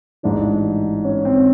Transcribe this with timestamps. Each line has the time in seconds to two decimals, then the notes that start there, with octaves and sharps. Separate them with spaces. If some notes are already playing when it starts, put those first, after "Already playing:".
0.23 A1 G#2 E3 D4
1.05 C#4
1.25 C4